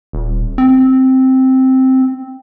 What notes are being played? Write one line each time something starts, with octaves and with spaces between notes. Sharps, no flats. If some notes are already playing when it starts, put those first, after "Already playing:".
D#1
C4